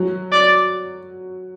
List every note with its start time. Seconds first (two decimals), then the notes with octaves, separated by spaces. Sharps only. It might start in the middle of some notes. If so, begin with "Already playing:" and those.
Already playing: F#3
0.32 D5